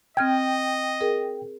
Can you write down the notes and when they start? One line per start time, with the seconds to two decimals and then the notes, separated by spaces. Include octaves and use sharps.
0.17 C4 D#5 G5 F6 G#6
1.01 G#4 A#4